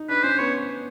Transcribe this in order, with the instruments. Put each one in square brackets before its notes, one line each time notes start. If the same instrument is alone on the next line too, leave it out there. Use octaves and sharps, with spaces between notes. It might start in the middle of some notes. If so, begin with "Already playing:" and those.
Already playing: [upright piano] D#4
[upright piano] D4 [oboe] B4
[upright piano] C#4 [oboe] C5
[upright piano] B3 [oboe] C#5